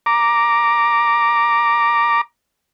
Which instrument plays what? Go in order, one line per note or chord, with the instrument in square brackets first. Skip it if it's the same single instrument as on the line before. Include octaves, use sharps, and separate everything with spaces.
[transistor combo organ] A#5 D6